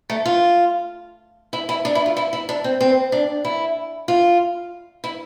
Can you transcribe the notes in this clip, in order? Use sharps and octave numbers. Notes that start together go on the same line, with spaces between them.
A3
F4
E4
E4
D4
E4
F4
E4
E4
D4
C4
C4
D4
E4
F4
E4